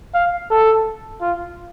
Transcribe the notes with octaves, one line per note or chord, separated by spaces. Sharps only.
F5
A4
F4